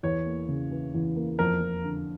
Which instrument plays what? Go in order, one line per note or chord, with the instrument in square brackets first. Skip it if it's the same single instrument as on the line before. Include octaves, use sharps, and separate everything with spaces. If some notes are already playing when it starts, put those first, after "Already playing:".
[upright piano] E2 [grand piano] C#5
[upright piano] A#3
C#3
E3
E2
A#3
[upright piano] F2 [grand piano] A#4
[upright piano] F2
D3